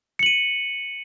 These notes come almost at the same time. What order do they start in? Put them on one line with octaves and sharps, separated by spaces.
C#7 F#7 D#7